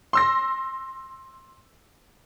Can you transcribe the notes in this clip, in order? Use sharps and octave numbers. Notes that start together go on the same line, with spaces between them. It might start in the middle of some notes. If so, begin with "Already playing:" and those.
C6 E6 A#6